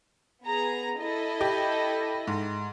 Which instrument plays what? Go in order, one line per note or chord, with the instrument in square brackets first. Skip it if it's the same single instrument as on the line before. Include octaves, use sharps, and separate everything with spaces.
[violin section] B3 G#4 A#5
E4 A4 D#5
[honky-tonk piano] G4
G#2